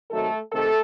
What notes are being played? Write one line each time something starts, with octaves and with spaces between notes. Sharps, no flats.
C3 D#3 F#3 A3 A4
C3 D#3 A3 A4